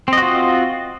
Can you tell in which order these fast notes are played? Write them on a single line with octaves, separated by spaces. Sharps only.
C4 D#5 F#4 F4